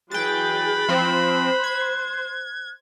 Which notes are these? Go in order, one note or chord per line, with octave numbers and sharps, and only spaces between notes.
E3 F#3 G#4 G5 B5 F#6 A6
F3 C4 C5
G#6